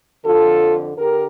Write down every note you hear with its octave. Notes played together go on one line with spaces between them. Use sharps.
F2 D3 F4 A4
D3 G4 A#4